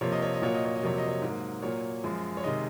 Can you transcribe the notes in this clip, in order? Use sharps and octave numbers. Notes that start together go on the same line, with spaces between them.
C3 F3 A#3 C#5
D#5
C#5
D#5
A#2 F#3 A#3 C#5
D#5
C#5
D#5
F2 C3 F#3 A#3 C#5
D#5
C#5
G#2 F#3 A#3
A#2 F#3 A#3 C#5
F#2 F3 G#3
C#5
C3 D#3 G#3 D#5